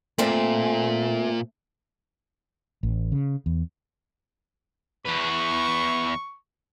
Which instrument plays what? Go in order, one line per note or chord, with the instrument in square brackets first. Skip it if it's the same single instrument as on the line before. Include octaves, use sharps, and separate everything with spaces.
[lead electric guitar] A#2 [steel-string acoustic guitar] A3 C4
[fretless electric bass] A1
C#3
E2
[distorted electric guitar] E2 B4 [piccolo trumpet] C#6